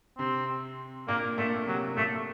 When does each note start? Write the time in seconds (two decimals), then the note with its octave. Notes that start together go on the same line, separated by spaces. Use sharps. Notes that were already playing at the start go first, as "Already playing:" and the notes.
0.18 C3 C4
1.08 A#2 A#3
1.38 A#2 A3
1.67 C3 F#3
1.97 A#2 A3